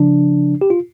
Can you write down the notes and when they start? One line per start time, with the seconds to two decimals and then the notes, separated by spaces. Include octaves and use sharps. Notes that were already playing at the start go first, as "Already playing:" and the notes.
Already playing: C#3 F3 D4
0.61 G4
0.70 F4